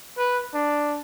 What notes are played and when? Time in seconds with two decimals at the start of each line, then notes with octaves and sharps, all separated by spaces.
0.18 B4
0.54 D4